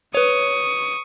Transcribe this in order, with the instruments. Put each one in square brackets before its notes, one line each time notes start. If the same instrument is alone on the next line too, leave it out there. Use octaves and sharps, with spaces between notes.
[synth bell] B4 C#5 [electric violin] C#6 D#6